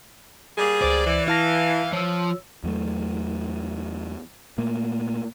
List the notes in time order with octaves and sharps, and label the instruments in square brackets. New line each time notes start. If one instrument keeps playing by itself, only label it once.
[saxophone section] G3 A#3 G#4
[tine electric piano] C#2 C5 [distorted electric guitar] D5
[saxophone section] E3
[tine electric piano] E4 A5 A#6 [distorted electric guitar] F5
[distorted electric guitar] F3 [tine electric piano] C#5 E6
[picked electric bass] E2 F#3 A3
A#2 A3 A#3